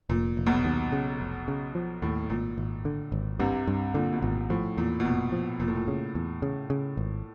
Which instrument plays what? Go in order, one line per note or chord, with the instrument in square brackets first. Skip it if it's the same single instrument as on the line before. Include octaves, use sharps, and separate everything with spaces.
[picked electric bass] F1 [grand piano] A#2
[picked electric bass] F1
[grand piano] B1 B2
[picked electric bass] D#2
C#3
F1
C#3
F3
[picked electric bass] D#2 [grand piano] A2
[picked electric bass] G#1 [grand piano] A#2
[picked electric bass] G#1
D3
G#1
[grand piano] C2 C3 [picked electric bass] G2
[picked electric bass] G2
[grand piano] A#2 [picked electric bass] D3
[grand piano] B2
[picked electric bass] G#1 [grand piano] A#2
[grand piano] A2 [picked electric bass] F3
[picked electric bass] E2 [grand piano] A#2
[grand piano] B2
[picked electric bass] F1 [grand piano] A#2
[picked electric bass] F3
[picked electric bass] F1 [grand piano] A#2
[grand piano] A2
A#2
[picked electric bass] C#3
E2
C#3
C#3
G#1